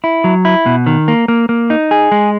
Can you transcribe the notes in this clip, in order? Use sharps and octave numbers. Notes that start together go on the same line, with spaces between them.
E4
F#3
E4
B2
D#3
A#3
A#3
A#3
D#4
G#4
G#3